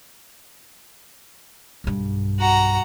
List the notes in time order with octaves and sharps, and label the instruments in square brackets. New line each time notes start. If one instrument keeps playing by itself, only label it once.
[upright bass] B1 G2
[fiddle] F#4 A#5